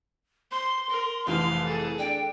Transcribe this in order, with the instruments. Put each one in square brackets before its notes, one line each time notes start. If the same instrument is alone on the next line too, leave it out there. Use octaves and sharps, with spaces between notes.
[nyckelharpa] C5 [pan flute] C6
[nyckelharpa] A#4
[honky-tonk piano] F1 F2 E3 [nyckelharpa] F5
[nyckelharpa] G#4 A4
[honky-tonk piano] D4 [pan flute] G5